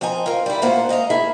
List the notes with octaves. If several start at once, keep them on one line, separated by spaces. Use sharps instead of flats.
F3 C4 D#5 G#5 A#5
F4 A#4
G3 E4
D2 A#2 A#3 F4 C5 F#5
G#2 D#5 F5 A#5
A3 A#3 E4 G#4 E5